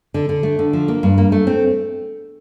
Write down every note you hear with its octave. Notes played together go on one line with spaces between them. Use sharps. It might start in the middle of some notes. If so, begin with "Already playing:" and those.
D3
D3
A3
D3
F3
A#3
G2
A#3
A3
C4